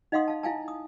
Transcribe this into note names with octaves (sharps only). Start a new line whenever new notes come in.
D#4 D#5 F5 F#5 C6 D#6
F5 A5
E4 F5 G#5 A5
D#6